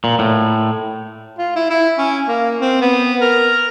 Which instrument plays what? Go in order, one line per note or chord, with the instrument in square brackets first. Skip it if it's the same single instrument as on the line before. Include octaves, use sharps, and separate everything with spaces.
[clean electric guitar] A#2
A2
[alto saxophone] F4
E4
E4
C#4
A#3
C4
B3
A#4